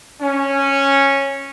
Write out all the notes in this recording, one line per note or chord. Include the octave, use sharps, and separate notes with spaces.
C#4